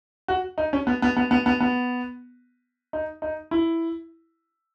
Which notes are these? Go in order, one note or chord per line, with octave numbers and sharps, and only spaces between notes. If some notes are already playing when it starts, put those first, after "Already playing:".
F#4
D#4
C#4
B3
B3
B3
B3
B3
B3
D#4
D#4
E4